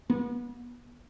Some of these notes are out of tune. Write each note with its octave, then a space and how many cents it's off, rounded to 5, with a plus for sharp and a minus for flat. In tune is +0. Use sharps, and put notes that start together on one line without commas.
B3 -35